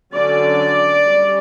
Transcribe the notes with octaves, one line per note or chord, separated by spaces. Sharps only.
D3 F#3 C#4 D5
G3 C#4